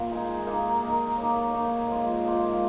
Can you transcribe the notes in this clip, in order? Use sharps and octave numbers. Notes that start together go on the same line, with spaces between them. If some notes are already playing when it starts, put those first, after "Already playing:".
Already playing: A#3 F4
G#3 D#4 G#4
A#3 D#4 A#4
A#3 D#4 A#4
A#3 D#4 C#5
A#3 D#4 C#5
G#2 F3 A#3 F4
G#2 F3 A#3 F4